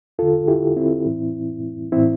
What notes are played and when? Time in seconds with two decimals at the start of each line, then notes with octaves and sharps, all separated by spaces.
0.19 E2 D3 F4 A4
0.48 E4 G4
0.77 C4 E4
1.05 A2 E3
1.92 A2 E3 C4 E4